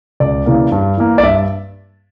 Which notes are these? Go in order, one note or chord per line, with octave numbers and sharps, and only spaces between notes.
C#2 D5
C#3 E3 A#3
G2
E3 A#3
D5
G2 E5